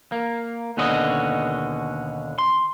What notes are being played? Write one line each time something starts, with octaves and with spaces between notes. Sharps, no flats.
A#3
D#2 B2 D3 C#4 F#4 D#5
C6